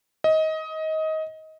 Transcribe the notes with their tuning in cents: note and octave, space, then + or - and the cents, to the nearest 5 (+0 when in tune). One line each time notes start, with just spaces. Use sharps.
D#5 +20